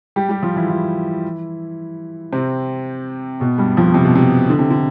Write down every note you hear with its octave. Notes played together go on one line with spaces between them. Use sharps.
G3 G4
G3 G4
F3 F4
E3 E4
E3 E4
C3 C4
B2 B3
G2 G3
F2 F3
C3
B2
C3
D3
C3
D3